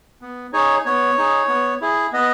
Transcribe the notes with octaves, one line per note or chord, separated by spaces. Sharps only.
B3
D#4 G#4 C#5
B3 C#5
D#4 G#4
B3
E4 G#4
B3 D#5